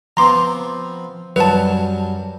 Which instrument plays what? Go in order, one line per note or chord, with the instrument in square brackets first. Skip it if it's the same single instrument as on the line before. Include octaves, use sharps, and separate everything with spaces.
[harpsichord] F3 B3 C4 [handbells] A#5 C6 D6
[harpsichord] F#2 F#3 G3 [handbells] B4 A5